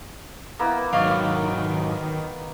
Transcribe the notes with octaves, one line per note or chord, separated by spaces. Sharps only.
A#3 B3 E4
G#2 D#3 F#3 D5 D#5 F5 C#6